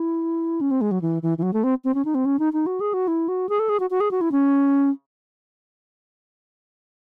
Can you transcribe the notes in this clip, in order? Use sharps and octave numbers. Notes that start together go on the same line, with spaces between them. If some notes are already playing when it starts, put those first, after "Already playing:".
Already playing: E4
C#4
C4
G#3
F#3
E3
E3
E3
F#3
A3
C4
C4
C#4
D#4
C4
C#4
D#4
D#4
F#4
G#4
F#4
E4
F#4
G#4
A4
G#4
F#4
F#4
G#4
F#4
E4
C#4